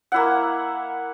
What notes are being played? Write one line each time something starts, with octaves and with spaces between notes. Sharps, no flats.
A#3 E4 F#5